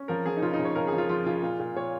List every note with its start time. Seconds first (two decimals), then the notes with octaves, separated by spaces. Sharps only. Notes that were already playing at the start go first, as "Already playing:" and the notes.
Already playing: C#4
0.08 F3 A#4
0.26 F3 G#4
0.37 D#4
0.42 C#3 F4
0.53 D#4
0.59 C#3
0.65 C#5
0.75 C#3 A#4
0.87 G#4
0.92 F3
0.98 F4
1.09 F3 F4
1.26 C#3 F4
1.43 A#2
1.59 A#2
1.76 A#2 C#5